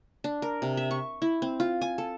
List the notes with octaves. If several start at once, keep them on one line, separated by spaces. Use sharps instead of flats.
D4
A#4
C3
E5
C#6
E4
C4
F4
G#5
A4